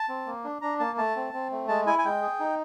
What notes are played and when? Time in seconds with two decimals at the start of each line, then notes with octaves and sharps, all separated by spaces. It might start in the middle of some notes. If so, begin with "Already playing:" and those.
Already playing: A5
0.09 C4
0.26 A#3
0.44 D4
0.62 D4 A#5
0.80 A#3 A5
0.98 A3 A5
1.16 C4
1.33 C4
1.52 A3
1.68 G#3 A5
1.86 E4 G#5
1.98 G#5
2.05 G#3 G5
2.22 G#4
2.40 D#4